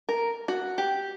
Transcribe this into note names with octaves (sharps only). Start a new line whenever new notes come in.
A#4
F#4
G4